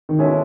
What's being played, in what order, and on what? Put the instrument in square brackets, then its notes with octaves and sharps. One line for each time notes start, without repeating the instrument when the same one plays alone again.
[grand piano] D#3
[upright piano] B2 G#3 C#4 E4 A4